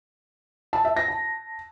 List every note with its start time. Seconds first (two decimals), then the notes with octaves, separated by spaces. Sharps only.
0.73 A5
0.85 E5
0.97 A#6
1.08 A5